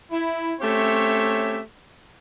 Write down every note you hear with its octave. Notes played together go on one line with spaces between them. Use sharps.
E4
A3 C4 C#4 G4 C#5 E5